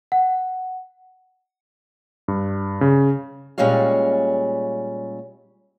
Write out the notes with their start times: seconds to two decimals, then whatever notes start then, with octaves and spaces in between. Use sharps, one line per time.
0.12 F#5
2.28 G2
2.81 C#3
3.58 A#2 G3 G#3 C#4 C#5 F5